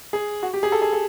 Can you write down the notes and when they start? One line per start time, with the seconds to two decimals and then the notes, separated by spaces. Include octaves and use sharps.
0.13 G#4
0.43 F#4
0.53 G4
0.63 G#4
0.72 A4
0.82 G#4
0.93 A4